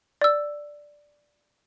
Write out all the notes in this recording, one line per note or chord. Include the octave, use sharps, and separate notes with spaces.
D5 E6